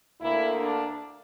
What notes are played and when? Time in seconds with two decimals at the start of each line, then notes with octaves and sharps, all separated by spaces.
0.20 D2 D3 A#3 E4
0.60 D4